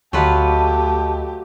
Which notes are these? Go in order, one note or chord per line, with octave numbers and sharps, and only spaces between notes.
D2 F#3 A3 F4 G4 B4 D#5 A5